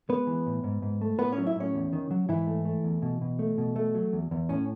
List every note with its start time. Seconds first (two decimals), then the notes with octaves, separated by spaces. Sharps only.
0.09 G#3 B3 B4
0.27 E3
0.46 A2
0.64 G#2
0.82 G#2
1.01 A3
1.19 A2 B3 B4
1.32 C#4 C#5
1.38 F#3
1.47 E4 E5
1.56 A2 C#4 C#5
1.75 E2
1.93 D#3
2.11 F#3
2.28 G#2 E3 E4
2.47 A3
2.65 A3
2.84 E2
3.02 B2
3.21 B2
3.39 A3
3.58 B2
3.76 A3
3.95 F#3
4.13 E2
4.31 E2
4.49 A2 C#4